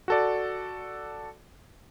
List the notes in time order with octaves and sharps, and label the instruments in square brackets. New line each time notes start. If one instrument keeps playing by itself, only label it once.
[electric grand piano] F#4 A4 D5